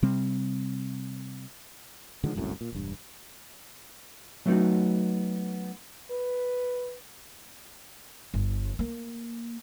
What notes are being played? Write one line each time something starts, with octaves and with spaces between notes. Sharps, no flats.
C3 G3 C4
D3 D#3 F3 G#3
G1 C2 F#2 A2
A#2
E1 G2
F#3 A3 B3 C#4 D#4 F#4
B4
G1
A#3